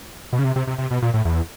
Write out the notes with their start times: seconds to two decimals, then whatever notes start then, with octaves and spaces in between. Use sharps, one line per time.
0.33 B2
0.39 C#3
0.44 C3
0.56 C3
0.67 C3
0.78 C3
0.91 B2
1.02 A#2
1.14 A2
1.25 E2